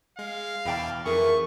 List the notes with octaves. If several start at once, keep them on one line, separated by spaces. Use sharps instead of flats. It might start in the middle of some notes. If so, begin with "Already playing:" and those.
G#3 F5
E2 B2 E4 D5 G5 A5
F2 G#2 E3 A3 G#4 A#4 C#6